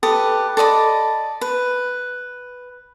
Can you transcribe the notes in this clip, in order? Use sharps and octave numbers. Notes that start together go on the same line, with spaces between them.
G4 A4 B4 D#6
A4 D5 D#5 B5
B4